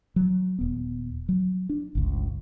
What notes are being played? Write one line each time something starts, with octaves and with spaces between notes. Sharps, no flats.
F#3
D#1 B3
F#3
D4
G1 C#2